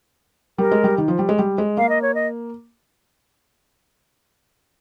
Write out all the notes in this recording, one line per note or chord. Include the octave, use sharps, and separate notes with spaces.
G3 A#4
G#3
G3
D#3
F3
G3
G#3
G3
G#3
A#3 F5
D#5
C#5
D#5